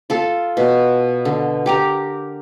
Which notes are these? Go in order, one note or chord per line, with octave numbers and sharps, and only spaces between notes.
F4 A4
B2
D3
G4 A#4 A#5